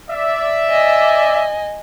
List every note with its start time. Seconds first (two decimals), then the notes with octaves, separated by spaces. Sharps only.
0.10 D5 E5
0.70 D#5 G#5